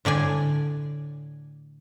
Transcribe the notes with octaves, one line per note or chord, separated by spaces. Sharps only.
A2 D3 D5 G#5